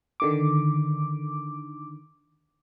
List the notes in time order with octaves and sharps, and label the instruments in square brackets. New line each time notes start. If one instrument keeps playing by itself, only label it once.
[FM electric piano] D3 D#3 D6